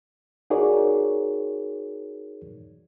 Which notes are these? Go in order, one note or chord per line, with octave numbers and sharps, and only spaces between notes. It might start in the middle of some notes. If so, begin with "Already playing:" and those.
D#4 F#4 G#4 A#4 C#5 D5